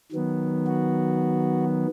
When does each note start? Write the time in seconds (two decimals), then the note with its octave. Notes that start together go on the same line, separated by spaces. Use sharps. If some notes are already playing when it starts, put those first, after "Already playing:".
0.12 D#3 F#3 B3
0.67 F#4